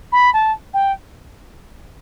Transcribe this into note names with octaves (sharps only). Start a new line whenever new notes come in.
B5
A5
G5